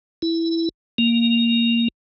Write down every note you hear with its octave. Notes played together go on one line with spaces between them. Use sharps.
E4
A#3